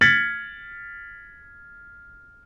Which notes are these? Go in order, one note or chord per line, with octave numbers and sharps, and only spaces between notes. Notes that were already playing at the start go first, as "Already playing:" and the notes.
F6 G#6 A6 B6 C#7 F#7